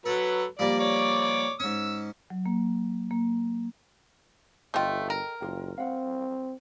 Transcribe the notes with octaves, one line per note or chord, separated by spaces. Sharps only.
F#3 A4 B4
F3 G3 A#3 D5
C#5 D5 D6
G#2 C#4 E6
F#3
A#3
A#3
G1 A3 F4 A4 D#5 G5
A#4
F#1 F4 G#4 G5
C4 F5 F#5